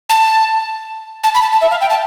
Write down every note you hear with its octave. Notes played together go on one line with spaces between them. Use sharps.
A5
A5
B5
A5
A5
E5
F5
G5
A5